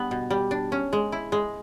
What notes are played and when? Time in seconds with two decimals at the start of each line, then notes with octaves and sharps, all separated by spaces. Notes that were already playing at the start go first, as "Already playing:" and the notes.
Already playing: G3 B3 D4
0.11 B2
0.30 G3
0.51 D4
0.72 C#4
0.93 G#3
1.12 E4
1.32 G#3